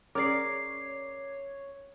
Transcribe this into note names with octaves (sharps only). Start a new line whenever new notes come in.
C#4 G#4 A#4 C#5 D5 D6 D#6 C7